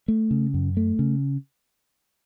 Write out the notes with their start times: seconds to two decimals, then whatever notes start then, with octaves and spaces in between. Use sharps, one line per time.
0.08 A3
0.31 C#3
0.54 F#2
0.77 A3
0.99 C#3